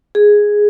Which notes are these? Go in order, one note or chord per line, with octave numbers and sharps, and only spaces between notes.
G#4